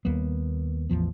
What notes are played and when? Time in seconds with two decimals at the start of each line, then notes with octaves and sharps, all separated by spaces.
0.05 D#2 G3 A#3 B3
0.89 A1 E2 F3 B3